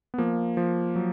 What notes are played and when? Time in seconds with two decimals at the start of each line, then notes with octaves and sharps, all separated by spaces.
0.14 B3
0.18 F3 A#3
0.57 F3
0.96 F#3